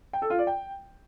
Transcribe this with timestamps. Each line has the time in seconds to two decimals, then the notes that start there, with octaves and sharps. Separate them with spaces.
0.13 G5
0.22 A4
0.30 F4
0.39 D5
0.47 G5